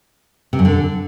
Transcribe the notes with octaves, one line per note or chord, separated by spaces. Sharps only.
C3
F#2
D3